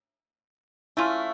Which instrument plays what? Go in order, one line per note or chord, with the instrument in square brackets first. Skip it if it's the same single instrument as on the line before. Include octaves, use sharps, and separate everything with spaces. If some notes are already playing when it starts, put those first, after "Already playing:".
[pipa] A3 C#4 F4 [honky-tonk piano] E4